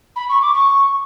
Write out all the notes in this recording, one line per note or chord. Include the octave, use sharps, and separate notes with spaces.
B5
C#6
D6
C#6